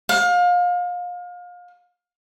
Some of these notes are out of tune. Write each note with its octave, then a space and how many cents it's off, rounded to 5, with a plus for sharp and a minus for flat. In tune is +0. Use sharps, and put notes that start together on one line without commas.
F5 +30